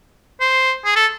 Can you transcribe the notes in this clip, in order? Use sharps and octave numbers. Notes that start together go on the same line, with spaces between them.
C5
G#4
A4